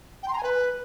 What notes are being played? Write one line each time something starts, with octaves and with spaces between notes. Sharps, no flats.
G5
C6
A#5
G#5
B4